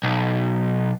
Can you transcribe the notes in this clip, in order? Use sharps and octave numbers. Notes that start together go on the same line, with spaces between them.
B1